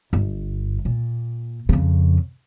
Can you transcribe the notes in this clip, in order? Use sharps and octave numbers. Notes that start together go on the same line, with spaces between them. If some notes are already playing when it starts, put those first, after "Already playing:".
G1
A#2
F2 C#3